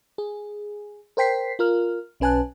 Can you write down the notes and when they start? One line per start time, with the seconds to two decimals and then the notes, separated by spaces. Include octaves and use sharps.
0.18 G#4
1.17 A#4 C5 G5 B6 C7
1.59 F4 A#4 F6
2.20 B1 C#4 B4 G#5 A5 F#6